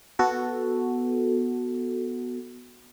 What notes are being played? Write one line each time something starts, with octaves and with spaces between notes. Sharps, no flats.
B3 F#4 A4